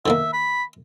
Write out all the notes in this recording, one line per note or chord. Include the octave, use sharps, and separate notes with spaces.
D3 D#3 A#3 E5
B5